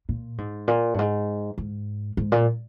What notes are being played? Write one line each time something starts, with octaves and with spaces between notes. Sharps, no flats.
A#2
G#2
A#2
G2
G#2
G#2
G#2
A#2